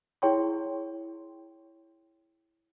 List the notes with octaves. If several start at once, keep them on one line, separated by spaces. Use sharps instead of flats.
E4 G#4 C#5 G5 C6 C#6